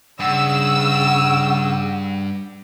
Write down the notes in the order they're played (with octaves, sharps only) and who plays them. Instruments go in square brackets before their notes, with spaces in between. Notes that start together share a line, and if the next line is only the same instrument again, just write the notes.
[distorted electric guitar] G2 [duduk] C#3 [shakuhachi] F#5 [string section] E6